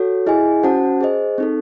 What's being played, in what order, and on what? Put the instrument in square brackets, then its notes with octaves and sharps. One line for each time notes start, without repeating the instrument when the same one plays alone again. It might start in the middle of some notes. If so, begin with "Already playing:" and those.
Already playing: [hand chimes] F#4 A4 C#5
E4 G#4 D#5 G#5
C#4 F#4 C5 F#5 A5
G#4 C5 D#5
C4 D#4 A4